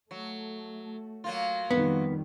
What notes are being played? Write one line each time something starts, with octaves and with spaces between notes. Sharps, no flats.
F#3 A3
F#3 A#3 F4
F2 D#3 G3 B3